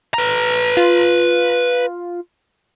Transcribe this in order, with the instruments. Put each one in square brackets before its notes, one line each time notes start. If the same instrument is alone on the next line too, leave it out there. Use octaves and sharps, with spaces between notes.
[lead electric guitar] B4 A#5
[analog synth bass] F4